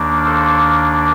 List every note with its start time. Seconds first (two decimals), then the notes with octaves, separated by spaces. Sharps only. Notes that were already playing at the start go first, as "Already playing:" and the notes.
Already playing: D#2 D#3 A#3 D4
0.26 A4 C5